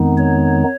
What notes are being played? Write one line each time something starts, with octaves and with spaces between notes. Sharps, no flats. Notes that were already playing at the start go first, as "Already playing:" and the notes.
Already playing: F2 D#3 G#3 B3 D#4
C#5